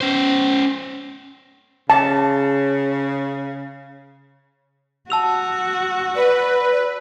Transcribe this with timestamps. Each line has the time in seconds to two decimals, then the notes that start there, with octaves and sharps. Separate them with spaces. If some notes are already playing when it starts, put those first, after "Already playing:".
0.01 C#4 C5
1.90 C#3 A5
5.10 F#4 A5 E6 F7
6.15 B4 D5